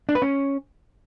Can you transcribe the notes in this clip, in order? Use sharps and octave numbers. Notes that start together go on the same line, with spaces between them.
D4
B4
C#4